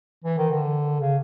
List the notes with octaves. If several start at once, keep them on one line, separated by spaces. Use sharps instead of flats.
E3
D#3
D3
C#3